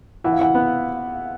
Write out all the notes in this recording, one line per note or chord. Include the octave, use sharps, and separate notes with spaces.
E3 F#5
F5
E3 F#5
B3